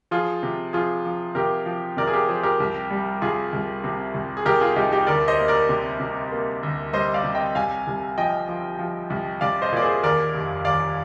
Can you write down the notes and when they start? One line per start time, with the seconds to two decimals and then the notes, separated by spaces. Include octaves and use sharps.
0.11 F3 F4 G#4
0.43 C3
0.73 F3 F4 G#4
1.05 F3
1.35 C3 G4 A#4
1.66 F3
1.97 C3 A#4 D5
2.07 G#4
2.13 G4 A#4
2.28 F3 G#4 C5
2.43 G4 A#4
2.60 C2
2.90 G3
3.22 C2 F4 G#4
3.53 C2
3.84 C3
4.14 C2
4.37 G#4
4.46 C2 G4 A#4
4.60 F4 G#4
4.76 C2 D#4 G4
4.91 D#4 G4
5.07 D2 A#4 D5
5.28 C5 D#5
5.39 A#3
5.48 A#4 D5
5.69 C3
6.00 C3
6.32 A#3
6.63 D2
6.93 G3 C5 D#5
7.14 D5 F5
7.24 C3
7.35 D#5 G5
7.55 C2 F5 G#5
7.87 C2
8.18 F3 D#5 G5
8.49 F3
8.79 F3
9.10 C2
9.41 C2 D5 F5
9.62 C5 D#5
9.72 A#2 D5
9.82 G#4 C5
10.03 D#2 A#4 D5
10.35 F1
10.65 D#2 D5 F5